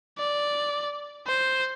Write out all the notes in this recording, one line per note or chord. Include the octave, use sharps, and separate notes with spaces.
D5
C5